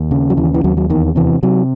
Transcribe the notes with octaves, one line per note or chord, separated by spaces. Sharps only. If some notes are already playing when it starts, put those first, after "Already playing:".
Already playing: D#2
C#3
F#3
D#2 E3
E3
D#2 F#3
F#3
E2 D#3
C3 E3
C3 F#3